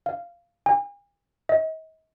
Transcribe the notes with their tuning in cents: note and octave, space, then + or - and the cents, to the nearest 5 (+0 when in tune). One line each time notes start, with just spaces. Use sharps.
F5 -10
G#5 -45
D#5 +40